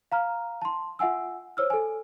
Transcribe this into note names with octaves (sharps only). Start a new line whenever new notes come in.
F5 A#5 F6
A5 C6
F4 E5 F#5 G#5 E6
C5 C#5 E6 F6
A4 G#5